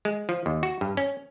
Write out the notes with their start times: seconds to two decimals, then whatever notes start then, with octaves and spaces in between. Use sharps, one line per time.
0.05 G#3
0.29 F3
0.46 D#2
0.63 F#4
0.81 G2
0.97 C#4